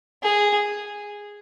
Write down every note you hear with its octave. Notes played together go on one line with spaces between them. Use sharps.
G#4